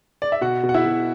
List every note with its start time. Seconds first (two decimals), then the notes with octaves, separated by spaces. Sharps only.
0.22 D5
0.32 E5
0.41 B2 F#4 F#5
0.63 B2
0.69 F#5
0.74 E4 E5
0.86 B2